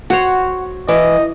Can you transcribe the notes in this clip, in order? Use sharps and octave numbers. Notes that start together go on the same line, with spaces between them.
F#4 C5 C#5 F#5
E3 D#5